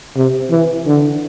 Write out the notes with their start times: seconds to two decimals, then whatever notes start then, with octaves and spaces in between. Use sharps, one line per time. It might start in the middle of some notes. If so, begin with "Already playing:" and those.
0.17 C3
0.51 E3
0.86 D3